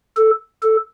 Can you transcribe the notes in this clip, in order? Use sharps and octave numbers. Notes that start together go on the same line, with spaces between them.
A4
A4